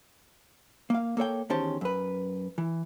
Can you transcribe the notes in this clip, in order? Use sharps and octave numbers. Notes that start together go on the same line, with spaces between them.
A#3 F5
A#3 A4 C#5 G5
E2 D#3 C#4 G4 C5 A5
F#2 B4
E3